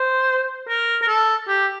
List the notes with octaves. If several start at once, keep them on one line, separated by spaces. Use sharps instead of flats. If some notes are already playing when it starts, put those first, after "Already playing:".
Already playing: C5
A#4
A#4
A4
G4